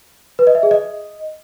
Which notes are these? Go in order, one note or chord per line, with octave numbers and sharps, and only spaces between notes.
B4
D#5
E5
G#4
D#5